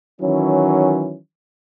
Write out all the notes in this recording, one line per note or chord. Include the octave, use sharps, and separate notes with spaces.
D#3 E3 F#3 C#4